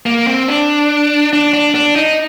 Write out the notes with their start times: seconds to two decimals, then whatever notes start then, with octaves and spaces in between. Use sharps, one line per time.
0.06 A#3
0.27 C4
0.48 D4
1.33 D4
1.54 D4
1.75 D4
1.96 D#4